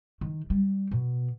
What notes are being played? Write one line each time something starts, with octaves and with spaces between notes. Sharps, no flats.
D#3
G3
B2